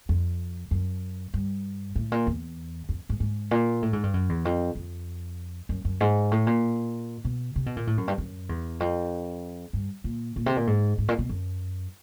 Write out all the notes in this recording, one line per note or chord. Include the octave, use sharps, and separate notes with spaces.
F2
F#2
G2
A2
A#2
E2
F2
G#2
G#2
A#2
A2
G#2
G2
F#2
E2
F2
F2
F#2
F#2
G#2
A2
A#2
B2
C3
B2
A#2
A2
F#2
G2
F#2
E2
F2
G2
A#2
A#2
C3
A#2
G#2
G#2
A#2
B2
F#2